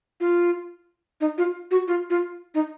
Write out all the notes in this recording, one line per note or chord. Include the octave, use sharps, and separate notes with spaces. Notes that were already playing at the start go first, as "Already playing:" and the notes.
F4
D#4
F4
F#4
F4
F4
D#4